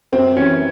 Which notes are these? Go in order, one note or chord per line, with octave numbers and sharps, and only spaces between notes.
F#2 C4
E3 C#4